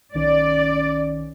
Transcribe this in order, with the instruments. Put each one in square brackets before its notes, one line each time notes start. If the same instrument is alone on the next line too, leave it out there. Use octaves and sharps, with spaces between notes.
[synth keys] B1 D#3 C#4 [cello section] D5